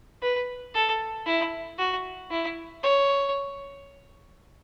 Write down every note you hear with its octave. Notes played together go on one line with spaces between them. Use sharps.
B4
A4
E4
F#4
E4
C#5